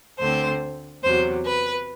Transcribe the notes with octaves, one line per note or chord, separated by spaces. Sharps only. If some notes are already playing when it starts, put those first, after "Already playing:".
D2 D3 A3 C4 C5
E2 C3 F#3 C5
B4